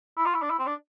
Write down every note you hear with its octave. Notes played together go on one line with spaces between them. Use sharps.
E4
F4
E4
D4
E4
C4
D4